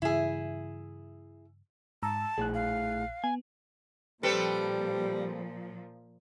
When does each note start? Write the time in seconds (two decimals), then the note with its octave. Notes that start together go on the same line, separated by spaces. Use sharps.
0.02 G2 C#3 E3 E4 G#4
2.03 G#2 A5 A#5 E6
2.38 A#1 A2 G#4 F#6
2.54 F5
3.24 B3 G#5
4.23 A#2 F3 G3 C4 A4 B4